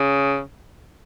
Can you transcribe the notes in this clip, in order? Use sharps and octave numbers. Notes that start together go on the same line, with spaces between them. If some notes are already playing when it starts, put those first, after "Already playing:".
Already playing: C#3